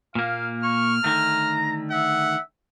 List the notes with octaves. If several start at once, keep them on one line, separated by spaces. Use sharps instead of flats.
A#2 A#3 F5
C#6 F6
D3 D#3 A3 A#5
E5 F#5